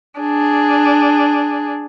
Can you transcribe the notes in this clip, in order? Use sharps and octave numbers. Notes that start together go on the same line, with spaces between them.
D4 G#4